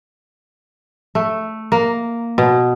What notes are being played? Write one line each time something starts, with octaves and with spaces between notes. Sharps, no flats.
A3
A#3
B2